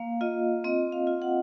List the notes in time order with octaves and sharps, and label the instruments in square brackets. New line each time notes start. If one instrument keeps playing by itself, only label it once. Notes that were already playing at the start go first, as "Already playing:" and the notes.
Already playing: [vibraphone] A#3 F5
F4 D#5
C4 D#5
F5
F4
F#5